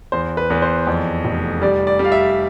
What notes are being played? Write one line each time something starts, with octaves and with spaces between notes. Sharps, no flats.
E2 C5
B4
E2 B4
C5
F2
F1
G3 D5
D5
G3
F5
E5